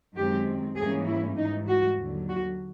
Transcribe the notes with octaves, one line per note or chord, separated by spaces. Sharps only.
F#2 D#3 G#3 C4 G4
G#2 E3 G3 A#3 C#4 G#4
E4
G#2 E3 G3 D#4
F#4
D#2 D3 F#3
F#4